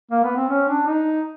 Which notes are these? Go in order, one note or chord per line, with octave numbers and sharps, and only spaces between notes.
A#3
B3
C4
C#4
D4
D#4